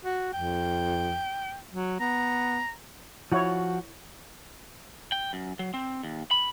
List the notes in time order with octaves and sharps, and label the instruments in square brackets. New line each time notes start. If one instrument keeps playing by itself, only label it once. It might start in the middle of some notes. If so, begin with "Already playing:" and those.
[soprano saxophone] F#4
[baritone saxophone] F2 [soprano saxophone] G5
[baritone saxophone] F#3
[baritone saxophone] B3 [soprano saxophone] A#5
[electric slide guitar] F3 F#4 [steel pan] E4 C#5
[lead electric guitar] G5
F#2
F#3
C4
D#2
B5